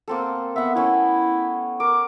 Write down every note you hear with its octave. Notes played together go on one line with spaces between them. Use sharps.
A#3 C4 A4
B3 E5 F#5
A3 C#4 E4 G5
A#4 D6